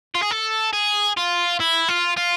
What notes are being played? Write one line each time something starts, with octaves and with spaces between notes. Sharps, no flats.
F4
G#4
A4
G#4
F4
E4
F4
F4